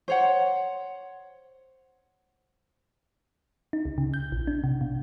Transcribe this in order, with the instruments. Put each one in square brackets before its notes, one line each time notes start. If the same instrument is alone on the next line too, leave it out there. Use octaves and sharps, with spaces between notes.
[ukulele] C5 C#5 F#5
[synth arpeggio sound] D#4
C#2
C#3
G6
A#1
D4
C3
B2